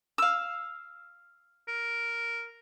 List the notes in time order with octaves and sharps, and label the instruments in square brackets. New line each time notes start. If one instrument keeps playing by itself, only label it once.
[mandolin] F5 E6
[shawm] A#4